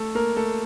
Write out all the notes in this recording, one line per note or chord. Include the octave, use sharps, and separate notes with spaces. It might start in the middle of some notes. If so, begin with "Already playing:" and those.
Already playing: A3 A4
A#3 A#4
A3 A4